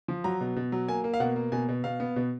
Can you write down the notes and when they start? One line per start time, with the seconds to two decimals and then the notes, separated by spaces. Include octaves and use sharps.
0.08 F3
0.24 F#3 A#5
0.41 B2
0.56 B2
0.72 F#3
0.88 A#3 G#5
1.04 A#3
1.14 F5
1.20 B2 F#5
1.36 A#3
1.52 B2 G#5
1.68 B2
1.84 B2 F5
2.00 B3
2.16 B2